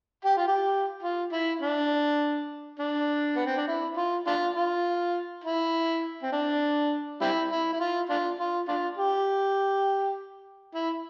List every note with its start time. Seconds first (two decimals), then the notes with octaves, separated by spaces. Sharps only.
0.25 G4
0.37 F4
0.47 G4
1.03 F4
1.32 E4
1.61 D4
2.79 D4
3.36 B3
3.46 C4
3.57 D4
3.68 E4
3.96 F4
4.27 D4 F4
4.56 F4
5.44 E4
6.22 C4
6.32 D4
7.21 G3 C4 E4
7.51 E4
7.72 E4
7.80 F4
8.09 D4 F4
8.39 F4
8.68 D4 F4
8.97 G4
10.74 E4